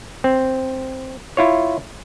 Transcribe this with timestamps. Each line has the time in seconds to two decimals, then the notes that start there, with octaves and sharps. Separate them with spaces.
0.24 C4
1.37 E4 F4 C#5